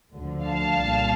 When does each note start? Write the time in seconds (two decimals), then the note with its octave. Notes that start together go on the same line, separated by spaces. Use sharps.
0.12 D2 D3 F3
0.45 F5 A5
0.78 C2 A#2 G3